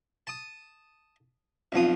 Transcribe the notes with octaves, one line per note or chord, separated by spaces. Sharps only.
A5 D#6
B1 F2 F3 D#6